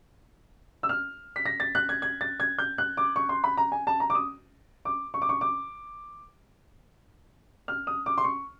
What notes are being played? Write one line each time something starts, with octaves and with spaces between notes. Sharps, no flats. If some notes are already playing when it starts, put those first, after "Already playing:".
E6
F6
B6
A#6
A6
F#6
G#6
G#6
A6
G#6
G6
F#6
D6
C#6
C6
B5
A#5
G#5
A5
A#5
D6
D#6
D6
C#6
D6
C#6
D6
F6
D#6
D6
C6
C#6